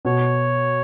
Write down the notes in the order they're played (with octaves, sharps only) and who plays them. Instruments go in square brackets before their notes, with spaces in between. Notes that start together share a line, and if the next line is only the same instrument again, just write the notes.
[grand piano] B2 [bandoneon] C#5